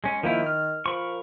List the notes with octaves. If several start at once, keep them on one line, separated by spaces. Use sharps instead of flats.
G#3 C#4
D#3 F3 A#3 E4
F6
F3 A#4 B5 C#6